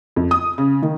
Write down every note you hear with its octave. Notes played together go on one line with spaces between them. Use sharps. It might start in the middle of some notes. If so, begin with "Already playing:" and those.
F2
D#6
C#3
D#3